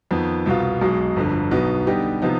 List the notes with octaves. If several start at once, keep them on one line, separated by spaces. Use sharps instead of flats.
F2 D#3 B3
C2 B2 B3 F4
B1 B2 G#3
G1 F2 D3
B1 B2 B3 D#4 B4
D3 G3 B3 D#4 G4
C3 F3 B3 D#4